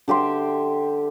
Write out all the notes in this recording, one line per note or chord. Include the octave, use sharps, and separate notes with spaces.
D3 G4 E5 C6